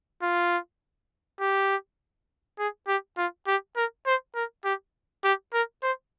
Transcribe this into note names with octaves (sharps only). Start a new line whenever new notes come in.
F4
G4
G#4
G4
F4
G4
A#4
C5
A#4
G4
G4
A#4
C5